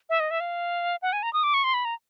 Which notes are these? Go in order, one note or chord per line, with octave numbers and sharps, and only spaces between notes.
E5
D#5
E5
F5
F#5
G#5
A#5
D#6
D6
C#6
C6
B5
A#5